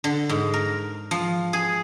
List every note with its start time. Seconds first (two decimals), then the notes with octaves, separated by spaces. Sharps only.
0.04 D3
0.29 G#2
0.54 A#4
1.11 F3
1.53 G#4